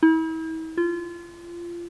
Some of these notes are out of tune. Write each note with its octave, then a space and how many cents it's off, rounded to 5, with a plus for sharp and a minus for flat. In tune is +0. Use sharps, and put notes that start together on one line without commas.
E4 -40
F4 -25